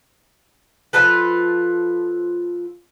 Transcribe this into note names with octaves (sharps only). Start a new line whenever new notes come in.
F3 F4 A4 B4